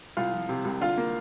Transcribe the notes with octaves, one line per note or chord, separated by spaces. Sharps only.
C2 F4 F5
F3
C3
C2
D3 F4 F5
A#3